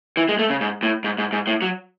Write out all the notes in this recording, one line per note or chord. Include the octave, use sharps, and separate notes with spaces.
E3
G#3
A3
C#3
G#2
A2
G#2
G#2
G#2
A2
F#3